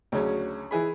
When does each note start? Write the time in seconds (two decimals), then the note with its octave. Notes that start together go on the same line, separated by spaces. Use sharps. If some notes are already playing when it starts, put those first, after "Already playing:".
0.12 D2 C#3 F#3 C#4
0.71 E3 G#4 B5